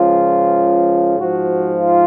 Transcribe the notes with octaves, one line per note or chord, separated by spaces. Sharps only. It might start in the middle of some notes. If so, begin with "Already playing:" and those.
Already playing: C#2 C#3 F3 F4
G#2 F3 F#4
F4